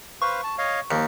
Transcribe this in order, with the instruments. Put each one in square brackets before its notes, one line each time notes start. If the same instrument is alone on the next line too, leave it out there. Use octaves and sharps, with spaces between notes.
[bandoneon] B4 C5 F5 [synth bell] C#6
[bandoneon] A5
C#5 D#5 F5
[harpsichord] D#2 [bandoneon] F3